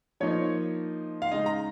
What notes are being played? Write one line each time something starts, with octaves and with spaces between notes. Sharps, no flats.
F3 A#3 D#4 C#5
F5
C#3 G#3 D#4 D#5
A#5